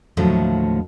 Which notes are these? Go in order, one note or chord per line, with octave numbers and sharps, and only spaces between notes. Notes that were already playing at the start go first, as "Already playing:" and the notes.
D#2 A2 D3 F3 F#3 A3